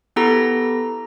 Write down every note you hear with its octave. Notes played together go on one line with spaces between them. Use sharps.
B3 E4 G4 A4 A#5 A#6